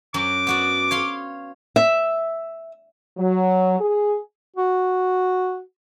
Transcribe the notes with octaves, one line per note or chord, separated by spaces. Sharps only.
F#2 F#3 D6
B3 F#4 D5
C#5 F5 C6
E5
F#3
G#4
F#4